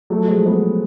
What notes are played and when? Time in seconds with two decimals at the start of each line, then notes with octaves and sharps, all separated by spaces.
0.10 F#3 A3
0.28 F3 G#3
0.46 G#3 B3